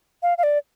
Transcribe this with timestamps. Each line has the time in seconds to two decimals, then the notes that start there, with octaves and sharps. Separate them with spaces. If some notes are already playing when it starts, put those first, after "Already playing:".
0.23 F5
0.38 F5
0.43 D5